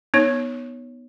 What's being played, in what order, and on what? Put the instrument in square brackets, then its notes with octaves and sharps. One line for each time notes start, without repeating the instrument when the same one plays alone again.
[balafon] B3 D#4 C#5